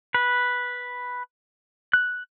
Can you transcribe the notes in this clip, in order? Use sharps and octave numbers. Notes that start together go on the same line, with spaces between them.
B4
F#6